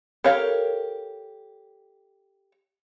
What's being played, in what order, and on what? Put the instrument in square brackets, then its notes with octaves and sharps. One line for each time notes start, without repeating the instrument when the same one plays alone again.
[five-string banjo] G4 A4 A#4 C#5 F5